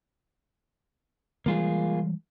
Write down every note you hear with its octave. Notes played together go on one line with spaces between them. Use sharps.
E3 G3 G#3 A#3 F4 G#4